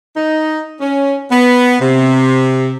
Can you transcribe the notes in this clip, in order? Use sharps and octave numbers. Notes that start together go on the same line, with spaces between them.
D#4
C#4
B3
C3